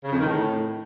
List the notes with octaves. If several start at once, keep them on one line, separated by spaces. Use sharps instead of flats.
C#3
F2
D#3
A2